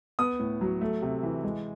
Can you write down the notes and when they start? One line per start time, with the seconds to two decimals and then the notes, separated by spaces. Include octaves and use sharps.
0.19 B3 D#6
0.39 A2
0.61 F#3
0.81 A3
1.02 C3
1.23 E3
1.44 G#3